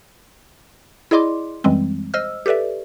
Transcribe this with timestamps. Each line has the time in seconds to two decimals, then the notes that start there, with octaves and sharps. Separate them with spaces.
1.11 E4 G#4 D5 D#5 C6 D6
1.64 F#2 E3 G3 G#3 C4
2.14 C5 D#5 E6 F6
2.46 G4 A4 B4 D5 E5